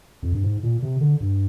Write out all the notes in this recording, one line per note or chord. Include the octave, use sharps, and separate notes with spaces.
F2
G2
G#2
A#2
C3
D3
G2